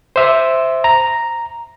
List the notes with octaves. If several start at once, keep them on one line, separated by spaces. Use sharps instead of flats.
C5 E5
A#5